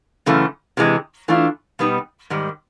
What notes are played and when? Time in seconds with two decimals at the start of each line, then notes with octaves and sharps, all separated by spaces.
0.26 F#2 C#3 E3 A3
0.77 C3 E3 G#3
1.28 E3 A3 D4 F4
1.79 B2 G3 B3 D#4
2.30 G#2 D#3 G3